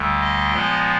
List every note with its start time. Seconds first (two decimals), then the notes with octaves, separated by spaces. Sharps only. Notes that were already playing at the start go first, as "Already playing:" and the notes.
Already playing: D2 D3 G3
0.21 D#5
0.54 A#2 F3 G#3 B3